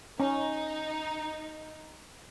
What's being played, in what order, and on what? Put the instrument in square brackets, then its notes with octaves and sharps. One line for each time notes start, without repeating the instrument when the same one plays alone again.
[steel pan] C#4 [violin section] D#4